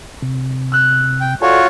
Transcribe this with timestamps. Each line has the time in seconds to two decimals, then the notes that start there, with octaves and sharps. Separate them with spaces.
0.22 C3
0.72 E6 F#6
1.21 G5
1.42 F4 F#4 A4 C#5 D5 G#5